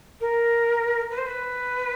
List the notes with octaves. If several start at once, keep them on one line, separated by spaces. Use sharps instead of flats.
A#4
B4
C5
B4